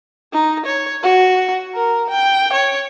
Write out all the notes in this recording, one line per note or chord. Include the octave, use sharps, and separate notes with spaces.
D#4
C#5
F#4
A#4
G5
C#5